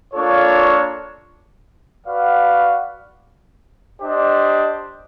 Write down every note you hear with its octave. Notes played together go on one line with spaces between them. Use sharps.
A#3 D4 F4 A4 C#5
F#4 B4 D5 F5
D4 G4 C5 D#5